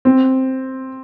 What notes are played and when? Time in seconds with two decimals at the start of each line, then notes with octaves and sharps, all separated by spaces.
0.05 C4